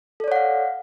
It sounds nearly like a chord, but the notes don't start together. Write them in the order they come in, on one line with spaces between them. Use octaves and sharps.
A4 D5 C#5 F#5 F5